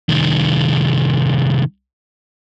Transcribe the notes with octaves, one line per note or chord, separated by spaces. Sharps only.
C2 D#3